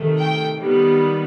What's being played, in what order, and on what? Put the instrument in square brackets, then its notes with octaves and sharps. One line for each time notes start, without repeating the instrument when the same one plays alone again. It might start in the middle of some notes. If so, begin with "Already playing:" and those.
Already playing: [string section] C3 D#3 A3
G5
D#3 G3 B3